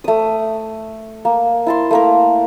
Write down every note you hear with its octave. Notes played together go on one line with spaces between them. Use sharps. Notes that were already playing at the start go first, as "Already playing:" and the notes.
A3 D#6
A#3
E4 A5 C6
A3 A#3 A#4